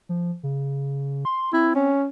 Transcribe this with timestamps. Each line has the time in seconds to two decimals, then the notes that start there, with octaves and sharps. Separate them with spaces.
0.09 F3
0.43 C#3
1.25 C6
1.53 C4 E4
1.75 C#4